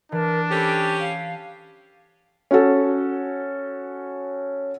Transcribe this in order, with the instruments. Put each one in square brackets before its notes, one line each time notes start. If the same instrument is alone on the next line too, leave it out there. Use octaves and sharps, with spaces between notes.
[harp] E3 [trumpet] D4 [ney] A#4
[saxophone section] C#4 G4 [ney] A4 [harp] C5 B5
[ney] F5
[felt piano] C#4 F#4 A4